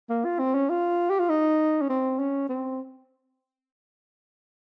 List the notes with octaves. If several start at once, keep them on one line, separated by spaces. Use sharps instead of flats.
A#3
F4
C4
C#4
F4
G4
F4
D#4
C#4
C4
C#4
C4